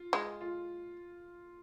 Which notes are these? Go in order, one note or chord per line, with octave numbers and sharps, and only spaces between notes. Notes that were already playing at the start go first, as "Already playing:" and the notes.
Already playing: F4
G#3
F4